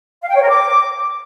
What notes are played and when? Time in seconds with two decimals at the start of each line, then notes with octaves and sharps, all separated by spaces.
0.21 F5
0.28 G5
0.35 C#5
0.42 A#4
0.49 D6